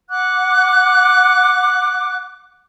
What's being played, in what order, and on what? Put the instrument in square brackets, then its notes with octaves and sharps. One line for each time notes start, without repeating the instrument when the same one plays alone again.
[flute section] F#5 D6 F#6